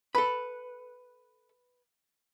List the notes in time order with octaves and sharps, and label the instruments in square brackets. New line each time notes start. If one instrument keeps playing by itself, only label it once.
[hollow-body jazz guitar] A4 B5 [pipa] B4